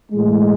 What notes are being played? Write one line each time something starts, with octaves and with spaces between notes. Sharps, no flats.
A2 E3 G#3